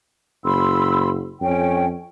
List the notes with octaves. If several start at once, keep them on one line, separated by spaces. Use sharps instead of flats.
F#1 B5 C6 E6
F2 C#4 G5